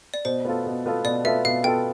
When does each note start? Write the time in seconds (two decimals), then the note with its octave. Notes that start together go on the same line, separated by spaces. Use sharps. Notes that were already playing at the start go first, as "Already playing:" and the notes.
0.14 D5
0.25 B2 C5
0.45 B3 F4 A4
0.66 B2
0.86 B3 F4 A4
1.05 B2 D5
1.24 B3 F4 A4 E5
1.45 B2 F5
1.64 B3 F4 A4 G5